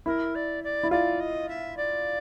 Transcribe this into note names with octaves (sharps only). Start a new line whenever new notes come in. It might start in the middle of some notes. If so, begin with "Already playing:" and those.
E4 A#4
D5
D5
E4
F4 D5
D#5
E5
D5